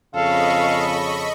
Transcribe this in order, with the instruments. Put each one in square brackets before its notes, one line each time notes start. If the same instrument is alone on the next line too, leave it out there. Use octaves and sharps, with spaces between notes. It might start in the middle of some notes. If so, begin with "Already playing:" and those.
[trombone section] F2 C#3 [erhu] A4 [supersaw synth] D#5 B5 C#6 [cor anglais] F5